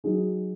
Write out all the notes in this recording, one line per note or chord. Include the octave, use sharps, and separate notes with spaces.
F#3 D#4 G#4